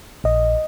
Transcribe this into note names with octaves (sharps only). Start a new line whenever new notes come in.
A#1 D#5